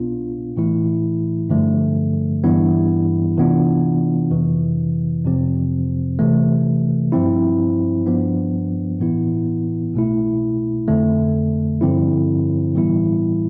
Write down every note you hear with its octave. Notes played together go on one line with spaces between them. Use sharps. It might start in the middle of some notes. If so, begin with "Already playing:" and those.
Already playing: C2 B2 B3 D4 F4
A2 E3 A3 E4
G2 D3 F3 A3
G2 E3 B3 E4
C3 E3 B3 D4 F4
F2 C3 E3
F2 C3 F3 C4
C3 E3 A3
G2 F3 C4 E4
G2 F3 B3 D4
A2 E3 B3 E4
C2 B2 A3 E4
F2 D3 A3
G2 D3 F3 C4 E4
A2 E3 G3 B3 E4